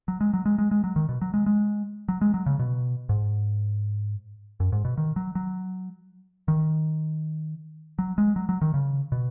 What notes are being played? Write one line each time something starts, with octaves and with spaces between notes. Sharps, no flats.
F#3
G#3
F#3
G#3
G#3
G#3
F#3
D#3
B2
F#3
G#3
G#3
F#3
G#3
F#3
C#3
B2
G#2
F#2
G#2
B2
D#3
F#3
F#3
D#3
F#3
G#3
F#3
F#3
D#3
C#3
B2